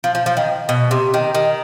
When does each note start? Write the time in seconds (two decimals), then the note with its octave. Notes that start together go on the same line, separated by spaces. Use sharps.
0.04 F3
0.15 F3
0.26 F3
0.37 D#3
0.69 B2
0.91 C3
1.14 D#3
1.35 D#3